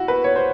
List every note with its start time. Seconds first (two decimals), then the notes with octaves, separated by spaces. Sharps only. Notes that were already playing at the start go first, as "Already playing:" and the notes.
Already playing: E4 F#4
0.08 B4
0.24 C#5
0.36 C5